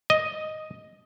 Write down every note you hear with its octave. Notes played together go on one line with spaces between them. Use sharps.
D#5